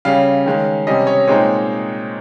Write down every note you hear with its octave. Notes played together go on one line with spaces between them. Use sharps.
C#3 G3 C#4 F5
D#3 G#3 C#4
C3 G3 C#4 D#5
C#5
A#2 G#3 C4 D#4 C#5